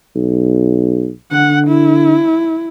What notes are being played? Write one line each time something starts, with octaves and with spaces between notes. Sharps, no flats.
B1
D3 F#5
E4